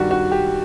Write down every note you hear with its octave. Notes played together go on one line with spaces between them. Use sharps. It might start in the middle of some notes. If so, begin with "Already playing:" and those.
Already playing: G2 D#3 G3 F#4
F#4
G4